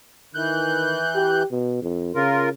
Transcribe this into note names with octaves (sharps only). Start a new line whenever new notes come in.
D#3 E3 F#6 G6
G4
B2
F2
C#3 F4 A#4